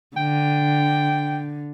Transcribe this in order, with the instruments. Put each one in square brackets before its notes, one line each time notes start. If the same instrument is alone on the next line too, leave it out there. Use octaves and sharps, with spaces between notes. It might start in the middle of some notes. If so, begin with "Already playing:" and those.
[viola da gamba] D3 [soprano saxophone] G5